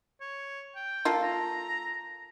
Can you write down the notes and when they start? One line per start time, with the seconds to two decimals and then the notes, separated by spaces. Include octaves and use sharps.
0.21 C#5
0.75 G5
1.05 A#3 F4 A4
1.23 A#5